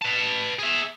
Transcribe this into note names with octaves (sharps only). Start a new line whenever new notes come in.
B4 A5
G#4 E5